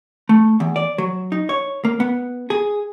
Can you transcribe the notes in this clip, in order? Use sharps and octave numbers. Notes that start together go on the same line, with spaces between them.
A3
E2
D5
F#3
D#4
C#5
A#3
B3
G#4